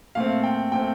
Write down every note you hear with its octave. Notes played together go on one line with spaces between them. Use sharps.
A#2 A3 C4 F5
G5
A#2 A3 C4 G5